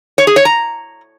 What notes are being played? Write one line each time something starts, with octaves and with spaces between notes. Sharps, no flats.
C#5
G#4
C#5
A#5